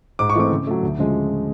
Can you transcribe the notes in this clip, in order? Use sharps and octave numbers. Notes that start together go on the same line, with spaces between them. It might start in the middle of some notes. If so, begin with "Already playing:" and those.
G#2 D6
C#6
E3 A3 C4 D6
C#3
F#3 A3
D2
C#3 F3 G#3